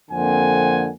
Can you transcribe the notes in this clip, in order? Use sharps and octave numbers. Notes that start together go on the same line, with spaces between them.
F2 D3 A#3 C4 F#5 G#5